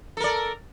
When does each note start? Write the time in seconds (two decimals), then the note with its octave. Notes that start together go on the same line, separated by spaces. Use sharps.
0.17 A4
0.20 A#4
0.24 D5